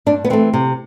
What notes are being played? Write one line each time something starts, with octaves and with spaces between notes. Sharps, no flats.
G2 D4
B3
E3 A3 C4
C3